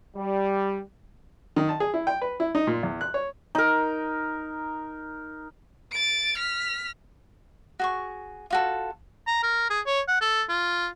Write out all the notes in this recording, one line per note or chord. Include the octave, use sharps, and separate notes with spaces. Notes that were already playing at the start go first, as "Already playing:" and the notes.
G3
D#3
A5
G#4
E4
G5
B4
E4
D#4
A#2
E2
F#6
C#5
D#4 A#4
A6 D7
F6 B6
F#4 G#4 C#6
F4 F#4 A4
A#5
A#4
G#4
C#5
F#5
A4
F4